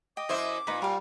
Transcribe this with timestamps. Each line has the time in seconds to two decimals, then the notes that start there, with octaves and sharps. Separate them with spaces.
0.17 D#5 G5 D6
0.29 F#2 E4 C5 E5 D6 D#6
0.67 A#2 D#4 B4 B5
0.82 G3 A#4 F5